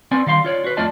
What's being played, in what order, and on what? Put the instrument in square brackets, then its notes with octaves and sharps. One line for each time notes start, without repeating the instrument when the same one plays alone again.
[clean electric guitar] B3 C4 D5 G#5
D#3 G3 F5 C6
F4 C#5 D5
F#4 B4
F2 A3 F4 D5 D#5 A5